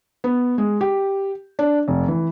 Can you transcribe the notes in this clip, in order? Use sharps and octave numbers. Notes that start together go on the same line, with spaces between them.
B3
G#3
G4
D4
F1
E3